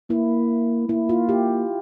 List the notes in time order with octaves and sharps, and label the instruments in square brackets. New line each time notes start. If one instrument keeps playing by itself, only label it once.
[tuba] A#3 [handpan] E4
[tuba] A#3 [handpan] E4
[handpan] F4
G4